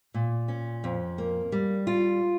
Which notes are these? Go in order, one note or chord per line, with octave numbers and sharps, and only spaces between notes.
A#2
C#4
F2
A#3
G3
F4